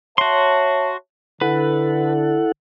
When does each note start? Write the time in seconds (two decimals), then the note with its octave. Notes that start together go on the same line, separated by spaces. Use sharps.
0.18 F#4 C#5 E5 A5 C6
1.41 D3 E4 A4 B4 F#5